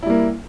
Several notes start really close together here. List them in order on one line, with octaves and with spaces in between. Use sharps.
E4 G3 A#3